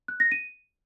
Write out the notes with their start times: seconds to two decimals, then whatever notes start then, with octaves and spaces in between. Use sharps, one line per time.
0.08 F#6
0.20 A#6
0.32 D#7